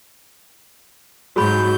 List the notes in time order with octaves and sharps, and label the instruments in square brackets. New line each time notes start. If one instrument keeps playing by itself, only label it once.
[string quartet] G#2 F#3 G6 [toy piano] F#4 G#4 B5